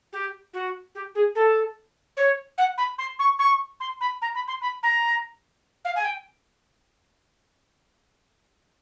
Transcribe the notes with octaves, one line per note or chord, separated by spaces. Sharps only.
G4
F#4
G4
G#4
A4
C#5
F#5
B5
C6
C#6
C#6
C6
B5
A#5
B5
C6
B5
A#5
F5
G#5
G5